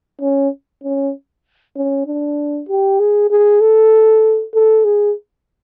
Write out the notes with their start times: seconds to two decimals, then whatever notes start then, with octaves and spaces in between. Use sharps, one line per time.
0.21 C#4
0.83 C#4
1.76 C#4
2.06 D4
2.69 G4
3.00 G#4
3.30 G#4
3.61 A4
4.54 A4
4.85 G#4